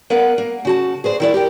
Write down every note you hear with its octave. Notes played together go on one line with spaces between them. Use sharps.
B3 A#4 B4 F5 F#5
A#3
C#3 F#4 A5
G#4 B4 C5 D5
D#3 E4 D5
G4 A#4 G5